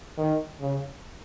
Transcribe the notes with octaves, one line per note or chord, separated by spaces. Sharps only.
D#3
C#3